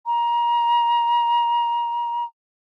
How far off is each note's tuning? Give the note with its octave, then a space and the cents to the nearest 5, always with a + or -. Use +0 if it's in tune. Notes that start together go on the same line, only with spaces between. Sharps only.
A#5 +25